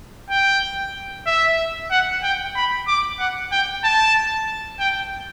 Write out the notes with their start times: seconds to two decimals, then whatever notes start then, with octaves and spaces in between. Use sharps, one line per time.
0.30 G5
1.27 E5
1.91 F#5
2.23 G5
2.56 B5
2.87 D6
3.19 F#5
3.52 G5
3.84 A5
4.80 G5